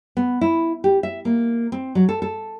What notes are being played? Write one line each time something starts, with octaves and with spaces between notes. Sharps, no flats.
B3
E4
G4
E5
A#3
C4
F#3
A4
A4